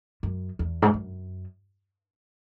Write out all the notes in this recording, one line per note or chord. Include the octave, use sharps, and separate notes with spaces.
F#2
E2
G#2
F#2